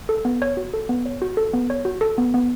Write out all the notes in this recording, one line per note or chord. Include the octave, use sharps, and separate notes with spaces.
A4
B3
C#5
F#4
A4
B3
C#5
F#4
A4
B3
C#5
F#4
A4
B3
B3